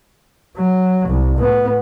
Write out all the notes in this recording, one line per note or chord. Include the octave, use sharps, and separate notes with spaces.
F#3
C2
A2 B3